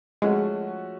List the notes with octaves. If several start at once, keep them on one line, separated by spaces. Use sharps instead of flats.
F3 G#3 A3 C#4 F#4